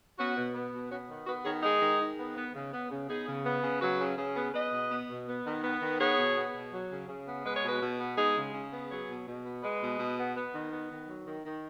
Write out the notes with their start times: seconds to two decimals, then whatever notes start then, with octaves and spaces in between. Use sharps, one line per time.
0.18 B3 C#4 F#4
0.36 B2
0.54 B3
0.72 B2
0.90 B3 C#4 F#4
1.09 D#3
1.27 B3 F#4 B4
1.45 D#3 G#4 C#5
1.63 G#3 D#4 G#4
1.81 D#3
2.00 D#3
2.18 B3
2.36 B3
2.54 C#3
2.73 B3
2.91 C#3
3.08 B3 D#4 G#4
3.27 C#3
3.45 B3
3.63 C#3
3.81 F#3 F#4 B4
4.00 C#3
4.18 C#3
4.36 B3
4.54 B3 B4 D#5
4.72 B2
4.90 B3
5.09 B2
5.27 B3
5.45 D#3
5.63 B3
5.81 D#3
5.99 B3 G#4 C#5
6.18 B2
6.36 B3
6.54 B2
6.72 F#3
6.91 C#3
7.09 C#3
7.27 B3
7.45 G#3 B4
7.56 C#5
7.63 B2 F#4 B4
7.81 B2
7.99 B3
8.17 G#3 D#4 G#4
8.36 C#3
8.54 C#3
8.72 B3
8.90 F#3 G#4 C#5
9.08 B2
9.27 B2
9.45 B3
9.63 G#3 B4 D#5
9.81 B2
9.99 B2
10.18 B3
10.36 B3
10.53 D#3
10.72 B3
10.90 D#3
11.08 F#3
11.26 D#3
11.45 D#3